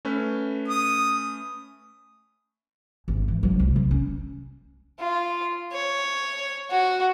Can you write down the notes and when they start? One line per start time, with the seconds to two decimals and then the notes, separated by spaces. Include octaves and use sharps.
0.05 A3 C#4 B4
0.68 D#6
3.08 G#1
3.28 E3
3.43 F#3 G#3
3.59 C2
3.76 D2
3.91 C#4
5.00 F4
5.72 C#5
6.71 F#4